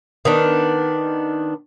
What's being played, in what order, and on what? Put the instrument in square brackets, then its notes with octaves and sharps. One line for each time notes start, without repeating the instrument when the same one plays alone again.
[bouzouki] D#3 B3 D4